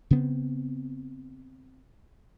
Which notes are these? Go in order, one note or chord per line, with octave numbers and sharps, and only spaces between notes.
C#3 B3 C4